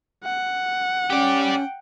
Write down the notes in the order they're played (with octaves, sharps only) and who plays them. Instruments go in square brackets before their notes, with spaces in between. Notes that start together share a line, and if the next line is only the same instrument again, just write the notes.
[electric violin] F#5
[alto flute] C#4 [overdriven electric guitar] G4 D5 [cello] G5